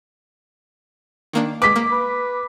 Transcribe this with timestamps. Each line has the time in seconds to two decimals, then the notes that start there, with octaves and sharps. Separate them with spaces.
1.33 D#3 A#3 D4
1.62 G#3 B4 D6 B6
1.76 A#3
1.92 B4